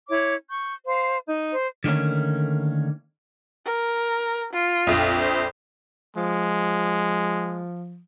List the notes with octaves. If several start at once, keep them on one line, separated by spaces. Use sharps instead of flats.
E4 C#5 D6
C#6 G6
C5 F5
D#4
C5
D3 D#3 A3 A#3 C#4
A#4
F4
A#1 F2
C5
F3 G#3